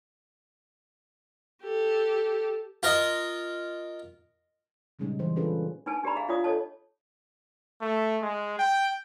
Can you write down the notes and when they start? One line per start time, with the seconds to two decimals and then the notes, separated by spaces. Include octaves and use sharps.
1.63 G4 A4
2.83 F4 A#4 D#5
4.99 A#2 C#3 G3 G#3 C#4 D#4
5.19 E3 C5
5.36 C#4 D4 F4 G#4 A4 B4
5.86 D4 D#4 B4 G#5 A5
6.04 D4 G4 B4 D5 A#5 B5
6.15 G#4 E5 F5
6.28 D4 F4 C#5 D5 F5 D#6
6.44 D4 A4 C#5 D#5 A5
7.81 A3
8.22 G#3
8.59 G5